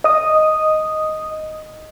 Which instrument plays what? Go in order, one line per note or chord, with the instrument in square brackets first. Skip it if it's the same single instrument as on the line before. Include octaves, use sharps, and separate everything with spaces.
[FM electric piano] D#5 D#6